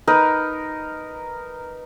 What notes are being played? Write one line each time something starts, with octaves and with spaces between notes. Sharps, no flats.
D#4 A#4 B4